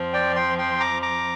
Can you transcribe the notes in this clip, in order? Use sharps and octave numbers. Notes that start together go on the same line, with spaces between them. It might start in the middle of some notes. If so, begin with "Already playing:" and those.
Already playing: F2 F3 C4
D5 G5
G5 C6
G5 C6
A#5 D6
A#5 D6